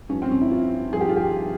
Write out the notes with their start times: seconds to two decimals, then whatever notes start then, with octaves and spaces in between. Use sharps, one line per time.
0.09 G2 F3 C#4
0.22 C4
0.31 C#4
0.41 E4
0.51 F4
0.93 G2 F3 G#4
1.01 G4
1.09 F4
1.16 G4